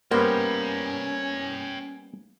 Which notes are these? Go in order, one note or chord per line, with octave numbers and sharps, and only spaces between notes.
G3 A#3 B3 C#4 C5 C#5 G5